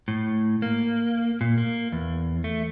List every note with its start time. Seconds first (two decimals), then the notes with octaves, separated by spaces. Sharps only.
0.08 A2
0.62 A#3
1.41 A#2
1.58 A#3
1.92 E2
2.44 A3